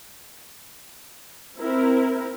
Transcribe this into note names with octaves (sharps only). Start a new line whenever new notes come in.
C4 E4 A#4